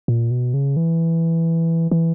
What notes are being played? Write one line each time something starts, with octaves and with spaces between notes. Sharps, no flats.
A#2
B2
C#3
E3
E3